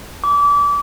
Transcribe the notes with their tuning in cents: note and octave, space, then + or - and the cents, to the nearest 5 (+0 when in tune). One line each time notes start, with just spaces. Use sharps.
D6 -30